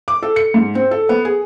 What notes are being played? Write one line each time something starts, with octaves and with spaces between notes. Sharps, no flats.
D6
A4
C#7
G#2
C4
A4
B3
G#4